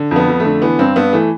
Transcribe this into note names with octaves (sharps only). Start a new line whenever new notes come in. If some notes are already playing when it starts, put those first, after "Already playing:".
Already playing: D3
F2
B3
F2
A3
D3
E3 B3
G2 C4
G2 B3
E3 A3